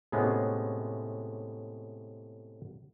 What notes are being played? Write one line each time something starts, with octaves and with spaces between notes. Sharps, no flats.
A2 C3 G#3 B3 C#4